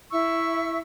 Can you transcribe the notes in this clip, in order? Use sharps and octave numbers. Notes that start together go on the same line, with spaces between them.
E4 E5 C#6 E6